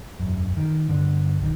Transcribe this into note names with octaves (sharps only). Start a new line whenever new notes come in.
E1 A1 F#2
D#3
G2 D3
B1 D#3